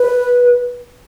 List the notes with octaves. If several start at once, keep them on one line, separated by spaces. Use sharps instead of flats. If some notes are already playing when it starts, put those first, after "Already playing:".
Already playing: B4